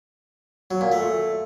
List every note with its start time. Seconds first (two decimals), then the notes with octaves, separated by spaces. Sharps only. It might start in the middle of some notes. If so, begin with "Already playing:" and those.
0.71 F#3
0.81 A#2
0.92 A3